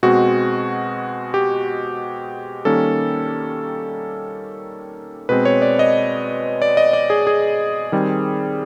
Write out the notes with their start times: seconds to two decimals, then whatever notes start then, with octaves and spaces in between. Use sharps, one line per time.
0.03 B2 G#3 C4 F#4
1.34 G4
2.65 D#3 G3 A#3 C#4 A4
5.29 B2 G#3 C4 B4
5.45 C#5
5.62 D5
5.79 D#5
6.62 D5
6.77 D#5
6.93 D5
7.10 G#4
7.27 G#4
7.92 D#3 G3 C4